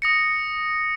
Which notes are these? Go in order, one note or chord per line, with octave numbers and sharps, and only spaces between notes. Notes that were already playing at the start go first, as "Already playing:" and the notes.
D#6 A#6 C#7